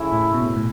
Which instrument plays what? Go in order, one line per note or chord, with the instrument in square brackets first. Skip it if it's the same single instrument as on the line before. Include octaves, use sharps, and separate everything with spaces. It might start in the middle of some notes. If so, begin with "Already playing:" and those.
Already playing: [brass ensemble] C#3 A3 C#4 E4
[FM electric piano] A2
B2
A2